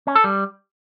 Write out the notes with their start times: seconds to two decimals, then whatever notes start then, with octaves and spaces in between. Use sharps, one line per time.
0.07 C#4
0.15 A4
0.24 G3